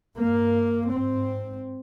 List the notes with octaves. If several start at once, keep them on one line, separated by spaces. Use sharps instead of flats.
G2 A#3
G#2 C4